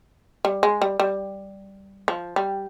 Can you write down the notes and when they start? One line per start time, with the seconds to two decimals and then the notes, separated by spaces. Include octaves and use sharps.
0.45 G3
0.63 G#3
0.82 G3
1.00 G3
2.08 F3
2.36 G3